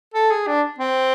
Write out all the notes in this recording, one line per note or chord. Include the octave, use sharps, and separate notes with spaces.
A4
G#4
D4
C4